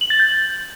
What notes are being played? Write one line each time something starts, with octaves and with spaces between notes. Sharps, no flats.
F#7
A6
G6